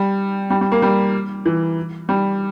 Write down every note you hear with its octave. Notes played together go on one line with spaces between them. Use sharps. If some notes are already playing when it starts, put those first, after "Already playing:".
Already playing: G3
G3
G3
A#3
G3
E3
G3